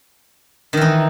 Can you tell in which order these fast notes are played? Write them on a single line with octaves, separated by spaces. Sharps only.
D#3 E3 D#4